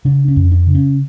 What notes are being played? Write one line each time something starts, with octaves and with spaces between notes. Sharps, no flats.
C#3 D4
C#4
F2
D4
C#3
C#4